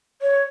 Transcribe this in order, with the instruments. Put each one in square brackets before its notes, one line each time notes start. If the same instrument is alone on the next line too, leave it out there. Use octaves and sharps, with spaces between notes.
[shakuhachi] C#5